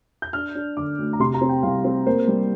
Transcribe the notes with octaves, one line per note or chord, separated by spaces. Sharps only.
G6
D4 F6
D4
D3 D6
D2
A#5
C3 C6
A#5
C4
G5
C2 F5
C4
A#3 C5
G3